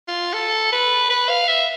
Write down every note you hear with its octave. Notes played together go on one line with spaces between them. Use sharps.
F4
A4
B4
B4
F5
E5